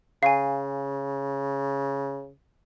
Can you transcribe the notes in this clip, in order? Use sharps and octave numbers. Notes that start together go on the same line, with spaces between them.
C#3 F5 G#5